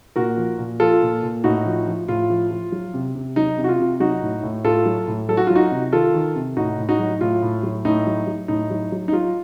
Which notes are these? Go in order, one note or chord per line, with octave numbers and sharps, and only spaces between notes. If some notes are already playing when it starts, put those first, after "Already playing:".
A#2 F#4 A#4
F3
A#2
F3 F4 A4
A#2
A#2
A2 D#4 F#4
F3
F3
A2 F4
F3
F3
F#3
C3
C3
F#3 D#4
C3
F#4
F4
C3
F#3 D#4 F#4
A2
A2
A2 F4 A4
F#3
A2
F#3 A4
F#4
F#3 F4
D#4 F#4
C3
D#3 F4 A4
D#3
C3
A2 D#4 F#4
A2
D#4 F#4
F#3
A2 F4
A2
F#3
A2 D#4
F#3
F#3
A2 D#4
F#3
F#3
D#4
F#3 F4